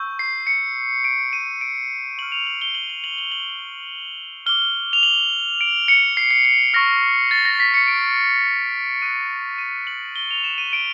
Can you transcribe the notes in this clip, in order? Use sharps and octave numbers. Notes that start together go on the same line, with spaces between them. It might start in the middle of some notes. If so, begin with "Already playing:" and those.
Already playing: C#6 E6 G6
C7
C#7
D7
D#7
D7
C#6 F6 F#7
F7
F#7
G7
F#7
F#7
F#7
F#7
F#7
D6 F6 G7
F7
F#7
D7
C#7
C7
C7
C7
C#6 F6 A#6
A6
A#6
B6
C#7
D7
D#6 F#6 D#7
D#7
F#7
G7
F7
E7
D#7
D7